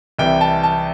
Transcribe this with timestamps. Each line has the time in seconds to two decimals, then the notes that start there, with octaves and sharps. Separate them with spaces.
0.19 C2 C3 E3 G5
0.41 A5
0.63 A5